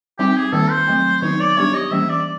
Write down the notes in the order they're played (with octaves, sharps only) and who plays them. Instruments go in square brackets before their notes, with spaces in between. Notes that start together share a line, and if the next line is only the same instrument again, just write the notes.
[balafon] G3 C4 D#4 [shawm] G4
[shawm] G#4
[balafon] D#3 G3 A#3 [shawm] A4
[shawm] C5
[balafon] F#3 A3 C4
[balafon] D#3 F#3 B3 D#4 [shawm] C#5
[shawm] D5
[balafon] G3 B3 D4 G4 [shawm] C#5
[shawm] D#5
[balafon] E3 G3 A#3 C#4 [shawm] E5
[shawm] D5